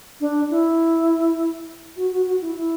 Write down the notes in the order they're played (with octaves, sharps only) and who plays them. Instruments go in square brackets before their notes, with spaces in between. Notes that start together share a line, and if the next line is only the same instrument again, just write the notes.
[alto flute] D4
E4
F#4
F#4
F#4
E4
E4